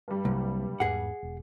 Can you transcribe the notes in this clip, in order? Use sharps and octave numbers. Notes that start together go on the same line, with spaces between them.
G2 G3
C2 C3 F#3 A#3
E2 G#2 G#4 F#5
E1